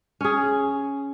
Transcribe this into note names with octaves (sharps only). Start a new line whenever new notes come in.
C#4 G#4